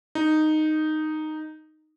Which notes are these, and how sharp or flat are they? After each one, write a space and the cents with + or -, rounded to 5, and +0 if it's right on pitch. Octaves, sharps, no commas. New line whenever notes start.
D#4 -10